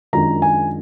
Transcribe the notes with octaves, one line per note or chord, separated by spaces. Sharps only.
F#2 D#3 G#3 D4 F4 A#5
G#5